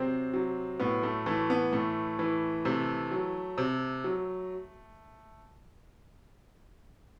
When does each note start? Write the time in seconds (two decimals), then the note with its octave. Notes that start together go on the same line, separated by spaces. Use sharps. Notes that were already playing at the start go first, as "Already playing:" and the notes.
Already playing: C3 F#3 C4
0.34 F#3
0.80 A2 B3
1.03 A3
1.26 E3 A3
1.50 B3
1.73 A2 A3
2.19 E3
2.65 C3 A3
3.11 F#3
3.58 C3
4.04 F#3